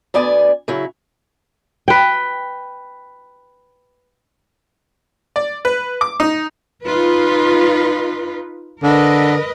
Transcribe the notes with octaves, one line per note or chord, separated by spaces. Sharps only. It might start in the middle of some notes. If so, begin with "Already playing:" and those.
D2 B3 D5 G#5
C#3 F#3 E4
B4 G5
D5
B4
D6
D#4
D#4 F4 B4
D3 A#4 B4 D#5